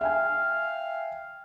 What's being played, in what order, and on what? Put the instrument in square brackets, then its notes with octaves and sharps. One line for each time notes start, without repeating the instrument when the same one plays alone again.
[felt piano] E5 G5 G#5 [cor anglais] F5